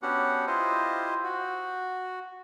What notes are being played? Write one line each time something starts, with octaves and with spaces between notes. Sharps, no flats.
B3 C#4 D4 F#4 G4 F#5
E4 F4 G4 C5 D#5
F#4